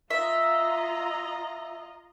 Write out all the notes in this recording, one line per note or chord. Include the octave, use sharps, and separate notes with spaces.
F4 D#5 E5 A#5